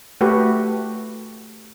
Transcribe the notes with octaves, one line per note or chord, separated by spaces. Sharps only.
A3 F#4 G4 B4